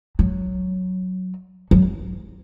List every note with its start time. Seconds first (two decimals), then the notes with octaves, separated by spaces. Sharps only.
0.19 F#3
1.71 F#3